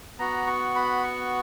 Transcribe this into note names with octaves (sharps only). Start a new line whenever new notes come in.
B3 F#4 A#5
C#6
B5
C#6